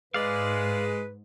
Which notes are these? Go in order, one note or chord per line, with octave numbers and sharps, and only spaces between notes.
G#2 G#3 B4 D5 F5